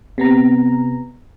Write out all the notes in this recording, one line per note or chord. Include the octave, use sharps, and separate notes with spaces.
C3 B3 A#5